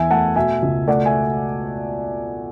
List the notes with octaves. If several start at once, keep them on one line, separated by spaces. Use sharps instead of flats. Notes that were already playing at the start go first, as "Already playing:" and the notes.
Already playing: E2 E5 G#5
A3 F#5 A5
B2 E5 G#5
C#2
A3 D5 F#5
E5 G#5